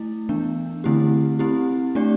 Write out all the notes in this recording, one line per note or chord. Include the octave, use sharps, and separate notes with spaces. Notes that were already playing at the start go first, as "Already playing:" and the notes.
Already playing: A3 E4
E3 B3 D4
D3 A3 C4 E4 G4
C4 E4 G4
A3 D4 G4 D5